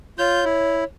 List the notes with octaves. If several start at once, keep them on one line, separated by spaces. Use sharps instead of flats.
F4 C#5 G6
E4